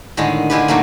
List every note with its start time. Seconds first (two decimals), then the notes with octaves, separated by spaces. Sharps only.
0.17 A2 D3 D#3 G#3
0.50 D3 G#3 E4 F4 G4 B4
0.68 A#2 D#3 F#3 A3 A#3